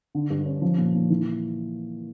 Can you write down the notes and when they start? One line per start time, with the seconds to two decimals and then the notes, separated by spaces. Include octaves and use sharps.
0.15 D3
0.30 G2
0.46 C#4
0.62 F3
0.78 A#2
0.94 A#2
1.10 E3